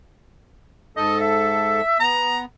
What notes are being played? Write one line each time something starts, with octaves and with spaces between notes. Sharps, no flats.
G#2 A4 D#5
E5
B3 A#5